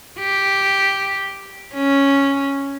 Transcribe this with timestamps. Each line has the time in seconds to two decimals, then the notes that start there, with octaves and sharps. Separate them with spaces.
0.19 G4
1.74 C#4